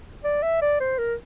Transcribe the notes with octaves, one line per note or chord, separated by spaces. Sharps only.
D5
E5
D5
C5
A#4